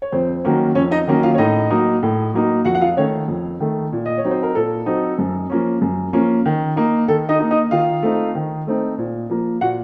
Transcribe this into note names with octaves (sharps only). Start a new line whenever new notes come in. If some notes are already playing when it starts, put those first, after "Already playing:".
C#5
F2 C4 C5
D#3 F#3 A#3 C#4
F2 C#4 C#5
D#4 D#5
D#3 F#3 A#3 C#4
F4 F5
C#5
A2 D#4 D#5
F#3 A#3 D#4
A2
F#3 A#3 D#4
F2 F#4 F#5
F#5
F4 F5
D#3 A3 C#4 C#5
F2
D#3 A3
A#2
D#5
C#5
F#3 C4 D#4
C5
A#4
A#2 A4
F#3 C4 D#4
F#2
F3 A#3 C#4
F#2
F3 A#3 C#4
D#3
A#3 D#4
D#3 A4
D#4 D#5
A#3 D#4
D#4 D#5
D#3 F4 F5
A3 C4 D#4
D#3
A3 C4 D#4
A#2
F3 A#3
A#2 F#4 F#5